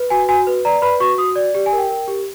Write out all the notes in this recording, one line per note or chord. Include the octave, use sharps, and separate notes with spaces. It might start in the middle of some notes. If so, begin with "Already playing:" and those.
Already playing: B4
F#4 G#5
F#4 G#5
B4
D5 A#5
B4 B5
F#4 C#6
F#4 D#6
D5
G4
G#5
A#4
G5
A#4
G4